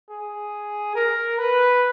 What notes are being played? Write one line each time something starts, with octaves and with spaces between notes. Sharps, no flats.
G#4
A#4
B4